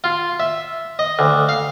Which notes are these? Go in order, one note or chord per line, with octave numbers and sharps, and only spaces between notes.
F4
E5
D#5
D2
F5